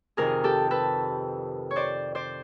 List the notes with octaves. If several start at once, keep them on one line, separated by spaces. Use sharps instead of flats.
F2 C3 D#3 G#4 A#4
G4 A4
A4 B4
C#5
C5 D5
C5 D5